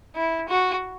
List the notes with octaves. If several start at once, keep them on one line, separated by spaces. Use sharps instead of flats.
E4
F#4